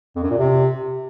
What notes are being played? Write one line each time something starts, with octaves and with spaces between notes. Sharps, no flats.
F2
F#2
A#2
C3